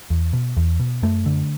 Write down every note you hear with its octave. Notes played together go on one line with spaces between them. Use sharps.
E2
B2
E2
B2
F#2 A3
D3